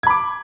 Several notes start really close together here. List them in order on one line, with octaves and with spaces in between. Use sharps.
G#6 B5 D6